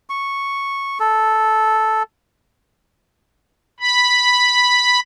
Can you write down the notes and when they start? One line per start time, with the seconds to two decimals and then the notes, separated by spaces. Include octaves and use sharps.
0.10 C#6
1.00 A4
3.80 B5